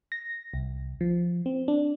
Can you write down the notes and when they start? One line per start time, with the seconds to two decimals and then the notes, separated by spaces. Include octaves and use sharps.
0.12 A#6
0.54 C2
1.01 F3
1.46 C4
1.68 D4